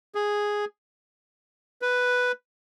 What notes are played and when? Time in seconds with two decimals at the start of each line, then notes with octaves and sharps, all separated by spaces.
0.15 G#4
1.82 B4